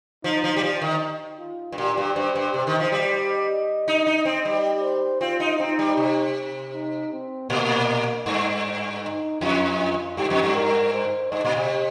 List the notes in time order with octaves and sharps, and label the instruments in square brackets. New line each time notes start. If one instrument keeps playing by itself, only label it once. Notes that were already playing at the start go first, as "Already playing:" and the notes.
[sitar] F3 [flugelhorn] D#4
[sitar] F3
G3
F3
D#3
[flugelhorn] F4
[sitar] G2
[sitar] A#2 [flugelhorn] G4
[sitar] G2
[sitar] G2 [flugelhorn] C5
[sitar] G2
C3
D#3
F3
G3
[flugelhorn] D#5
[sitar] D#4
[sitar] D#4 [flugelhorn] D#5
[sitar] C4
G3
[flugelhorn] C5
[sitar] C4 [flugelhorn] F4
[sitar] D#4
[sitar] C4 [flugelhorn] D#4
[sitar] G3
C3
[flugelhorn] D#4
C4
[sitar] A#2 [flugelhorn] A#3
[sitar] G2
[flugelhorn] D#4
[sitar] F2 [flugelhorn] F4
[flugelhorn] F4
[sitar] G2 [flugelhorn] G4
[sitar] F2
G2
[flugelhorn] A#4
C5
[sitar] G2 [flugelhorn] D#5
[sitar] A#2
C3